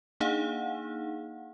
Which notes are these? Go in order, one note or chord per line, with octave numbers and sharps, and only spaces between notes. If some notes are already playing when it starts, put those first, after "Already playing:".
A#3 D4 D#4 G#4 F5 F#5